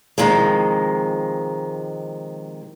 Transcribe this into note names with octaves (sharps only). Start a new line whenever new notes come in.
C3 D#3 F3 G#3